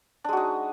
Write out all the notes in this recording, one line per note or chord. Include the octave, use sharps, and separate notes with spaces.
G#3 D4 D#4 F#4